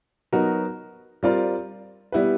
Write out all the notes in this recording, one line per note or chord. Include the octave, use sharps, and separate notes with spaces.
F#3 B3 D#4 F#4 A#4
G3 C4 F4 A#4 D5
G3 B3 E4 G4 B4